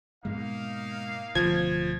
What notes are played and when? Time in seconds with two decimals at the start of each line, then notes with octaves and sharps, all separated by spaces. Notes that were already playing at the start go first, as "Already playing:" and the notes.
0.25 G#2 B2 G#3 A#3 D#4 F5
1.35 D1 D2 B2 F3 G#6